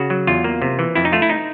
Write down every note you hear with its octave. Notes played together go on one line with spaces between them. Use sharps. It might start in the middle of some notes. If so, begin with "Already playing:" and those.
Already playing: C#3 F#4
F#3
E2 F4
A#3
C3
E3
F2 E4
D#4
A3 F4
E4
D#4